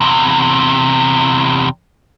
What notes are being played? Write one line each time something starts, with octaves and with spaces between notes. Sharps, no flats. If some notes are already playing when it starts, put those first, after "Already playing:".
E2 C3